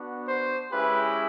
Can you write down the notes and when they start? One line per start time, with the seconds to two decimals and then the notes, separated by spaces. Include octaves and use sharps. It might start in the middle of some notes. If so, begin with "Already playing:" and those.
Already playing: B3 D4 F#4
0.28 C5
0.72 G#3 C#4 E4 G4 B4